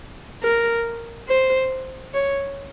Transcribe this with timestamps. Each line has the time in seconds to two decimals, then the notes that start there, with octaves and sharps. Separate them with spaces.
0.43 A#4
1.28 C5
2.14 C#5